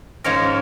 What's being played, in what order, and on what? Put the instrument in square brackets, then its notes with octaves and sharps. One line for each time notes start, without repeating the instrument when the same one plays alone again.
[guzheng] G#2 F3 G#3 C#4 A#4 C#5